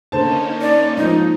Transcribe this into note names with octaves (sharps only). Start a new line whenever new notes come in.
D3 A#3 C#4 D#4 C5 A5
D5
G#2 F3 D#4